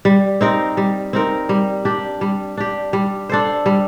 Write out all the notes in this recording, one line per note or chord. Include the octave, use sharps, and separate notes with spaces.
G3
C4 D#4 A#4
G3
C4 D#4 A#4
G3
D4 G4
G3
D4 G4
G3
D4 A4 C5
G3